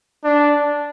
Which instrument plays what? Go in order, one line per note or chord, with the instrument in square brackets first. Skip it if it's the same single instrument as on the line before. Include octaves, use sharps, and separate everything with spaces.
[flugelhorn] D4